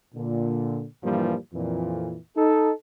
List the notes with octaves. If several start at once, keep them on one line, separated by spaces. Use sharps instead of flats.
A#2 D3
G2 A#2 E3 F3 G3 A#3
F2 A#2 E3
D#4 A4